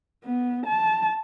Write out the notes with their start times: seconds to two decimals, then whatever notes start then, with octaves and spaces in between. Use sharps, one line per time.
0.25 B3
0.66 A5